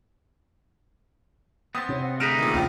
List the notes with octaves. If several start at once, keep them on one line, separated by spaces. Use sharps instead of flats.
B3 C4 D#6 A6
C3 C#5
F#5
D2 D#4 G#4 B4 F6 D7 E7
A#2 D#3
C2 F2 C#3 F4 G5